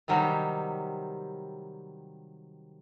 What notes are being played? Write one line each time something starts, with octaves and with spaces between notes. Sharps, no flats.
C3 D#3 F#3 G3